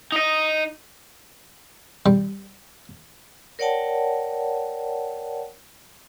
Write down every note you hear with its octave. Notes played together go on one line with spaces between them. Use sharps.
D#4 D#5
G3
A#4 C#5 D5 F#5 G5 A5